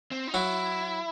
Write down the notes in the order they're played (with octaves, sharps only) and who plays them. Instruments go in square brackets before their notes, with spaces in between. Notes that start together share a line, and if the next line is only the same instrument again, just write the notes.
[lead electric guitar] C4
D#4
[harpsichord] F#3 F#4 [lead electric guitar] E4